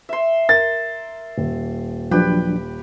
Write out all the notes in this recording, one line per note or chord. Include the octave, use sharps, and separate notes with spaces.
E5 C6
A#4 A6
D#1
F3 F#3 D4 G4 B4